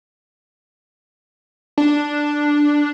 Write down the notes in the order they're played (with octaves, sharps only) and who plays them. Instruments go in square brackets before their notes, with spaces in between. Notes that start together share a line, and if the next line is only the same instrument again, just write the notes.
[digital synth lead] D4